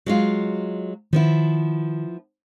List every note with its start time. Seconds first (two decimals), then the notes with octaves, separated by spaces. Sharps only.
0.06 F#3 G#3 F4
1.13 D#3 F3 B3 E4